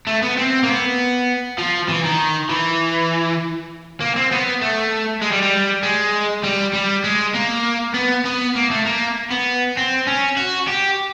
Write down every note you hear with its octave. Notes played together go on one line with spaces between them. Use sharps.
A3
B3
C4
A#3
B3
F3
E3
D#3
E3
A#3
C4
B3
A3
G#3
G3
G3
G#3
G3
G3
G#3
A#3
B3
B3
A#3
A3
A#3
B3
C4
C#4
F#4
G4